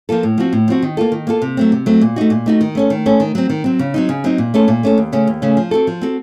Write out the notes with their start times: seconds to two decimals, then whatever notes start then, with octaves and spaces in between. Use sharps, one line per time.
0.09 F3 A#3 F4 A4
0.23 A2
0.38 F3 C4 F#4
0.53 A2
0.68 F3 C4 F#4
0.82 D#3
0.97 A#3 F4 A4
1.12 D#3
1.27 A#3 F4 A4
1.42 C3
1.57 F#3 A3 C4
1.72 C3
1.86 F#3 A3 C4
2.01 A#2
2.16 A3 D#4 F#4
2.30 A#2
2.46 A3 D#4 F#4
2.61 D#3
2.75 A3 C#4 A4
2.90 D#3
3.06 A3 C#4 A4
3.20 D#3
3.35 F#3 C4
3.49 D#3
3.64 F#3 C4
3.79 C#3
3.94 F#3 C4 D#4
4.09 C#3
4.24 F#3 C4 D#4
4.38 A#2
4.54 A3 C#4 A4
4.68 A#2
4.83 A3 C#4 A4
4.98 D#2
5.12 C#3 A3 C#4
5.27 D#2
5.42 C#3 A3 C#4
5.57 F3
5.71 C4 F#4 A4
5.87 F3
6.02 C4 F#4 A4